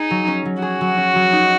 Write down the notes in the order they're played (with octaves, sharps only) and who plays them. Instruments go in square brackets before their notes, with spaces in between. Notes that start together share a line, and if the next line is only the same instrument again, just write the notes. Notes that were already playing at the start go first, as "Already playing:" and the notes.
Already playing: [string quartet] D#4 [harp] G#4
[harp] F#3
C#4
F#3
[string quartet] F#4 [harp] G#4
[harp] F#3
C#4
F#3
D#4